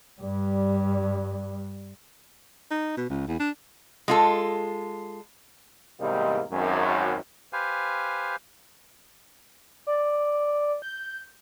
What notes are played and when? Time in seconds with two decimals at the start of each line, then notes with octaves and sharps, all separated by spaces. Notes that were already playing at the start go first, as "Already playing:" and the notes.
0.21 G2 G3
2.71 D#4
2.97 B2
3.10 C#2
3.28 E2
3.40 D4
4.08 G#3 F4 A4
6.01 E2 G#2 C3 G3 A#3 D#4
6.51 G#1 F#2
7.53 G4 B4 C5 F5 G#5
9.87 D5
10.82 G6